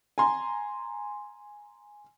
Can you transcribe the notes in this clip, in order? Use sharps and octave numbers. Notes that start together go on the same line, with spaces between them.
G#5 A#5 C6